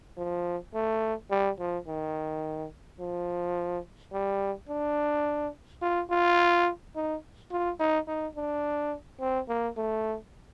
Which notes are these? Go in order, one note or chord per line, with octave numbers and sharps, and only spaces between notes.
F3
A3
G3
F3
D#3
F3
G3
D4
F4
F4
D#4
F4
D#4
D#4
D4
C4
A#3
A3